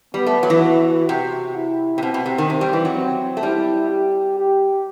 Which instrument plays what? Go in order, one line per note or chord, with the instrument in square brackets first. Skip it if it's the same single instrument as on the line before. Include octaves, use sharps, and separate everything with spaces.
[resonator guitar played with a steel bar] G3 [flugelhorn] B3
[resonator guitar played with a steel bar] A3
F#3
E3
[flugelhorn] F#4
[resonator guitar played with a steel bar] C3 [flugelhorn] F#4
[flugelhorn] E4
[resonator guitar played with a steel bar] C3
[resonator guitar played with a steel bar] B2 [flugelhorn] C4
[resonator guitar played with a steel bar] B2
C3
D#3
[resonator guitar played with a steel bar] C3 [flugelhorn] C4
[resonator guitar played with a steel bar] G3
E3
F#3
[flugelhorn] C4
[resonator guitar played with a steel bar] A3
[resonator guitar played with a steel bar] G3 [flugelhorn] E4
[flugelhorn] G4
G4